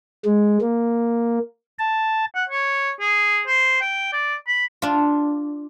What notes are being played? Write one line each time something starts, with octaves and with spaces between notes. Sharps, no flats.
G#3
A#3
A5
F#5
C#5
G#4
C5
G5
D5
B5
D4 F4